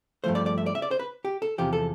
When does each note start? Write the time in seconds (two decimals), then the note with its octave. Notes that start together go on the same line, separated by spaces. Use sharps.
0.24 G2 F3 A3 C5
0.35 D5
0.46 D5
0.58 E5
0.66 D5
0.75 E5
0.82 D5
0.91 C5
0.99 B4
1.25 G4
1.42 A4
1.58 E2 C3 F3 G4
1.73 A4